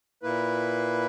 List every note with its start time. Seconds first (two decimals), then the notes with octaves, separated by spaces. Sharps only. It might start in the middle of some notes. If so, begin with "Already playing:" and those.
0.22 A#2 A#3 E4 B4